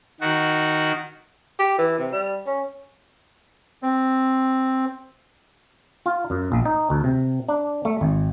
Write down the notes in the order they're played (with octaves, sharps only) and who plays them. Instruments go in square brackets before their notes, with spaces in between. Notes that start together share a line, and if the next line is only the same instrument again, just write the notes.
[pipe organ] D#3 F#4
[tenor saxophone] G4
E3
C3
G3
C#4
[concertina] C4
[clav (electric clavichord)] F4
F#2
A#1
D#4
D2
C3
D4
A3
G#1